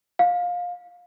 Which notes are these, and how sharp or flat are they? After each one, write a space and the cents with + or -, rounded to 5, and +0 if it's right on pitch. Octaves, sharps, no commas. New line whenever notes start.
F5 +20